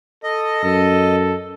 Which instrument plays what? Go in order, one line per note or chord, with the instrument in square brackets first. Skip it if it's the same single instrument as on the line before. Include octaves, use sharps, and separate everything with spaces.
[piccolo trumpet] A4 [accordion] D#5
[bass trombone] F#2 [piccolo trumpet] A4